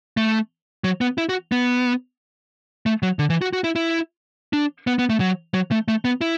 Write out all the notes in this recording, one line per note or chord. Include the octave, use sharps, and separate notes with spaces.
A3
F#3
B3
E4
F#4
B3
A3
F#3
D3
E3
F#4
F#4
E4
E4
D4
B3
B3
A3
F#3
F#3
A3
A3
B3
E4